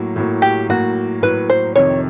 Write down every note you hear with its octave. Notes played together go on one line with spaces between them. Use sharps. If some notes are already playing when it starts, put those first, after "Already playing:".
Already playing: A2 F#3 A#3
A2 F#3 A#3
G4
A2 F#3 A#3 F#4
A2 F#3 A#3 B4
C5
F2 C3 D#3 C#5